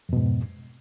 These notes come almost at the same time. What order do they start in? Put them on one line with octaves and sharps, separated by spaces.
F2 B2 G#2